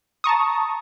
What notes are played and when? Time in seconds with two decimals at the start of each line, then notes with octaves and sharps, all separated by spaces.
0.24 A5 A#5 C#6 D#6